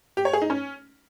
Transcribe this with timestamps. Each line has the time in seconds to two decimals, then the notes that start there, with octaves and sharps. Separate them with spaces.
0.17 G4
0.25 C#5
0.33 G#4
0.42 D#4
0.50 C#4